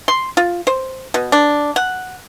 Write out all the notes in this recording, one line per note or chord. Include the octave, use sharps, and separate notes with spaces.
C6
F4
C5
B2
D4
F#5